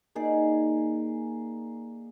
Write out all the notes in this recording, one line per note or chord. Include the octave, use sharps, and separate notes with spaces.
A#3 D#4 G#4 D5